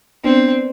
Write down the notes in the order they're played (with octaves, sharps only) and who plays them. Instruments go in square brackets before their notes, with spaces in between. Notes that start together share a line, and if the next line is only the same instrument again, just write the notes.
[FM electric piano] B3 D4 [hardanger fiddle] C4